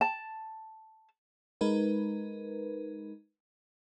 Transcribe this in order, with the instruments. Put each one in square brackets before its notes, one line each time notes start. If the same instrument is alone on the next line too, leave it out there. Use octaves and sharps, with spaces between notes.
[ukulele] A5
[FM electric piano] G#3 D#4 A#4 B4